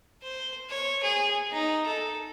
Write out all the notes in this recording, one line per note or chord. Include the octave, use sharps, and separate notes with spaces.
C5
C#5
G#4
D#4
A4